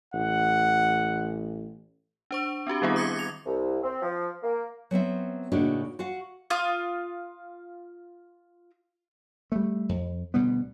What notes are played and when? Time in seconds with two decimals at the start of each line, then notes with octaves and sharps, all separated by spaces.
0.14 A1 F#5
2.31 D4 C5 C#6
2.67 C4 D4 F#4 G4
2.82 D#3 G3 B3 C4 E4 G#4
2.96 D6 D#6 G#6 A6 C#7
3.16 A#6 F7
3.45 C2
3.82 C4
4.02 F3
4.43 A#3
4.91 F#3 B3 C4 E5
5.52 A2 C#3 A#3 D4 D#4 F#4
5.99 F#4 F5 F#5
6.50 F4 F5 D#6
9.52 G3 A3
9.89 F2
10.34 D2 B2 G3 B3